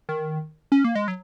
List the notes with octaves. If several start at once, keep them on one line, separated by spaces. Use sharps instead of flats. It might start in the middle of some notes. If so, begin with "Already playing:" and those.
D#3
C#4
A#3
G#3
F#3